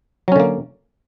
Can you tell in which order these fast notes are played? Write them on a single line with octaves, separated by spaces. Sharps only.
F#3 C#4 D3 A#3